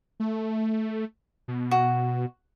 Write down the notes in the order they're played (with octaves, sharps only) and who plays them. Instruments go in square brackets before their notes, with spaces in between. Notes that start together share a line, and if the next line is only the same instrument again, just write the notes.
[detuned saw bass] A3
B2
[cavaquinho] F#4